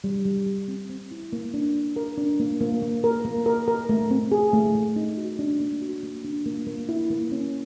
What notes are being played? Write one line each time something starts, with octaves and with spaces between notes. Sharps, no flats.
G3
G3
G3
C4
C4
E4
A#3
D4
D4
A#4
D4
A#3
A#3
A#3
A#4
A#3
A#4
A#4
A3
C4
G#4
A3
A3
D#4
F#4
D4
A#3
F#4
A#3
D4
A#3
A#3
E4
A#3
C#4